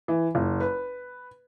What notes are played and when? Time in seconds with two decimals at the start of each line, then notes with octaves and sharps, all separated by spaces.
0.08 E3
0.35 F#1
0.60 B4